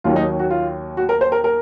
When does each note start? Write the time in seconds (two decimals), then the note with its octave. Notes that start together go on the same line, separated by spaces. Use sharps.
0.04 D#2 D#3 F#3 F4
0.16 D#4
0.39 F#4
0.50 F4
0.97 F#4
1.09 A#4
1.21 C5
1.32 A#4
1.44 A#4